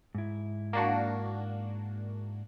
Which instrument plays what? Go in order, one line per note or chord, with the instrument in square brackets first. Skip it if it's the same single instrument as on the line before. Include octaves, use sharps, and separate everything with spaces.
[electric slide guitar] G#2 E4
[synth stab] A#3 D4 F#4